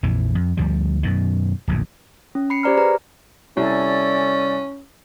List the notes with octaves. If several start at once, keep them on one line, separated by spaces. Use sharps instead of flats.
A#1 F2 E3
F2
D2 F3 G3
F#2 B2 D#3
D1 A#1 F2
C#4
B5 C7 C#7
G4 C5 D5 A#5 F6
G#4 B4 A#5
C2 C#4 A4 D5 G#5